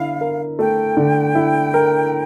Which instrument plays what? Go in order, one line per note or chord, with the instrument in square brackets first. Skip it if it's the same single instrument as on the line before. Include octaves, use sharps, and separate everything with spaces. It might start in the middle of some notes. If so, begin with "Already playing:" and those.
Already playing: [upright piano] D3 E4 [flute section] F5
[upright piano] A#4
[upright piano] A3 [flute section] G5
[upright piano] D3
E4
A#4